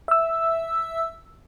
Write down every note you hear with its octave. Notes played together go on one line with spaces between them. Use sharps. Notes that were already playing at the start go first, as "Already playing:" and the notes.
E5 E6